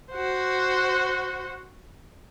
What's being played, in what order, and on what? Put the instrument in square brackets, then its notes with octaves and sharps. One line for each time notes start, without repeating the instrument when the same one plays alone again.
[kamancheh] F#4 C5